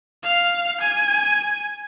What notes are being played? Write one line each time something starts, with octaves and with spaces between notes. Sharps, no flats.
F5
G#5